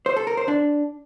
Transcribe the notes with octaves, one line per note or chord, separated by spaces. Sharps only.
C5
A4
A#4
C5
D4